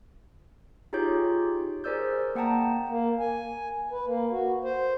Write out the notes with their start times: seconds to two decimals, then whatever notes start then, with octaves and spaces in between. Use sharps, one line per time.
0.93 D#4 F4 G4 G#4 C#5 G6
1.84 G#4 A#4 C5 D5 E6 G6
2.35 A#3 F#5 G5 A5 A#5
2.89 A#3
3.20 G#5
3.91 B4
4.06 A#3
4.31 F#4
4.64 C5